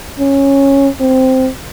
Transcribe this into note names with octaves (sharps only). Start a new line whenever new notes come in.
C#4
C4